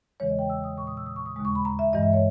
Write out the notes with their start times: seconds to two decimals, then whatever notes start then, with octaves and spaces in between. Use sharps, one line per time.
0.20 E2 C#3 E3 G#3 C#5
0.29 D#5
0.39 G5
0.50 E6
0.64 D#6
0.78 A#2 G#3 C#6
0.87 D#6
0.97 E6
1.06 D#6
1.16 C#6
1.26 D#6
1.36 D#2 C#3 G#3 D#6
1.45 C#6
1.55 B5
1.65 A#5
1.79 E5
1.93 G2 E3 G#3 D#5
2.03 E5
2.13 C#5